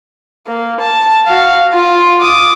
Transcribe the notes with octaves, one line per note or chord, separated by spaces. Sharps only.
A#3
A5
F#4 F5
F4
D6 D#6